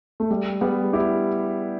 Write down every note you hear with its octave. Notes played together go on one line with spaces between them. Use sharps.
A3
G3
G3 B3
E4 G4